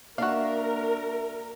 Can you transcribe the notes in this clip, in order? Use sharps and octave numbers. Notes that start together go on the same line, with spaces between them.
A#3 D4 F#4 A#4 E5 F5